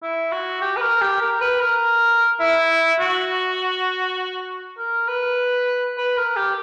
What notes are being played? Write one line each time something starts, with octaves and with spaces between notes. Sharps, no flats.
E4
F#4
G4
B4
A#4
G4
A#4
B4
A#4
E4
F#4
A#4
B4
B4
A#4
G4